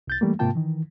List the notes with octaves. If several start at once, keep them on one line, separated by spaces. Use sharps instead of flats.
C2 G6 A6
E3 G3 A3 A#3
G#2 C3 A#3 F4 G5 A5
D#3 E3